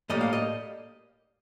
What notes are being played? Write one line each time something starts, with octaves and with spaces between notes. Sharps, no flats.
A2 G3 A#3 D#5
F5
D#5